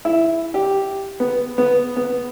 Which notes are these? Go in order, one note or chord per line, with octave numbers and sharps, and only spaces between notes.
E4
G4
B3
B3
B3